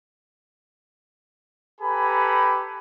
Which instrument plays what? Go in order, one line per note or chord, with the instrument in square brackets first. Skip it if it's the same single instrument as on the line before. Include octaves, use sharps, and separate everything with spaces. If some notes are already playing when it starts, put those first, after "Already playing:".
[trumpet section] G4 A4 B4 G#5 A#5 B5